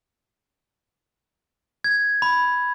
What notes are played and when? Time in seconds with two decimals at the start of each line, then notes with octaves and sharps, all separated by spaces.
1.84 G#6
2.22 B5